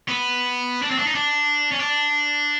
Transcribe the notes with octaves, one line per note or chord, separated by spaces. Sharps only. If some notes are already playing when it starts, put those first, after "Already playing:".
B3
D4
C4
D4
D#4
D4
C#4
D4